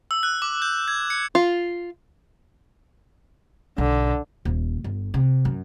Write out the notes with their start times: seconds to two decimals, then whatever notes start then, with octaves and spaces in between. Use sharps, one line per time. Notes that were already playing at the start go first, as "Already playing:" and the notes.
0.11 E6
0.23 F#6
0.42 D6
0.62 G6
0.88 G#6
1.10 C#7
1.35 F4
3.78 B1 D3
4.45 D#1
4.84 G1
5.14 C3
5.45 F#2